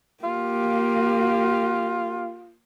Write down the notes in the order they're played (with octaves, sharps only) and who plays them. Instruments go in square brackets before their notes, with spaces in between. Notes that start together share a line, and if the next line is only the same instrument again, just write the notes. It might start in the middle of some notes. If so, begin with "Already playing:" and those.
[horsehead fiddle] A#3 G4 [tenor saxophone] F4